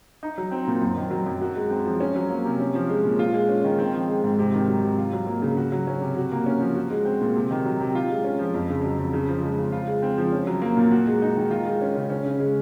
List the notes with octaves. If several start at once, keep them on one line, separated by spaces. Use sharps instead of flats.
D#4
F#3
C4
A#2
F#2
D#3
F#3
F#2
F#4
G#3
C4
F3
C#4
F#3
A#3
C3
C#4
F3
G#3
A#2
F4
G#3
C#4
D#3
C4
F3
G#3
G#2
C3
D#3
F#3
C3
F4
F#3
A#3
C#3
F#4
F#3
C#4
C3
F#4
A#3
C#4
F3
F#4
G#3
C4
A#2
C3
D#3
F#3
C3
F4
G#3
C#4
F3
F2
C#3
F#3
F2
C#3
F3
G#3
C#3
F4
G#3
C4
F3
C#4
F#3
A#3
A#2
F#4
G#3
D#4
D#3
F4
G#3
C#4
C#3
C#4
C#3
G#3